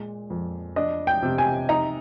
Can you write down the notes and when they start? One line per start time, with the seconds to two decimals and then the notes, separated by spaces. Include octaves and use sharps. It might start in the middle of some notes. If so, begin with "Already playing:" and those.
Already playing: A#2 G#3
0.30 F2
0.76 D4 D#5
1.07 G5
1.22 C3
1.38 G#5
1.69 D#4 A#5